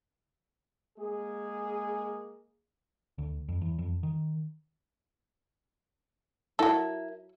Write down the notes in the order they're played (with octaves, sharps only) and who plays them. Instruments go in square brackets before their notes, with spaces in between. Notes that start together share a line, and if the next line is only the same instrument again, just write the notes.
[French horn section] G#3 A#3 G#4
[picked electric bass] D2
F2
E2
F2
D#3
[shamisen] F#3 A4 [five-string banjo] E4 A#4